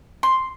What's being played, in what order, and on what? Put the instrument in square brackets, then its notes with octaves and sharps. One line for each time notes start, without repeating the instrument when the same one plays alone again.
[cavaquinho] C6